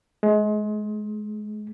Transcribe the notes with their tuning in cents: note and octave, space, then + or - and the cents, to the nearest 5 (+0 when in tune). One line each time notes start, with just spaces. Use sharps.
G#3 +30